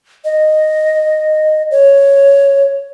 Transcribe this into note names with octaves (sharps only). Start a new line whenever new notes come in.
D#5
C#5